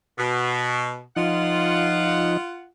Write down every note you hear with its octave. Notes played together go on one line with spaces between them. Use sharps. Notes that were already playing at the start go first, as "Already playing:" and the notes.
B2
F3 D#4 F4 F#5